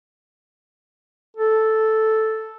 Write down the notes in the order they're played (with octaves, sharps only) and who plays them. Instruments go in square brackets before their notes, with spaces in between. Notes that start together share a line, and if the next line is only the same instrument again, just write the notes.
[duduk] A4